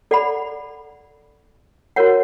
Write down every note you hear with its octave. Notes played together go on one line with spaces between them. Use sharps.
A4 D5 F#5 B5
F#4 A#4 C#5 F#5